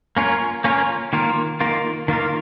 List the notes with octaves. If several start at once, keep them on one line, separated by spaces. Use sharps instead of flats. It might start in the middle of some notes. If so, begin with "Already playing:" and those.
A#3 C#4 F4 A#4 C#5
A#3 C#4 F4 A#4 C#5
D#3 A#3 F4 A#4
D#3 A#3 F4 A#4
D#3 A#3 F4 A#4